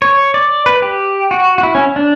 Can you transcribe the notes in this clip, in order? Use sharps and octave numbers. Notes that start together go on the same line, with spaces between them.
C#5
D5
B4
G4
F#4
F#4
E4
C#4
D4